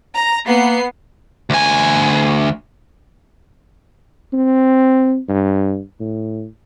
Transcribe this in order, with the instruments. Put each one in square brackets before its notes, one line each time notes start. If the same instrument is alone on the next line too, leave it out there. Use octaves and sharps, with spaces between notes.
[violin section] A#5
[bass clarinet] A#3 [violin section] B3 C7
[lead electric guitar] D2 G#5
[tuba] C4
G2
A2